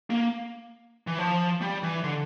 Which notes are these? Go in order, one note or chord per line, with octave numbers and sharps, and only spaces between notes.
A#3
E3
F3
G3
E3
D3